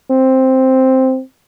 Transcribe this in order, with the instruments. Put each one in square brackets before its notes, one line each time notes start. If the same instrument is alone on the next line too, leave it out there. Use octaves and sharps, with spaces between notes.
[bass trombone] C4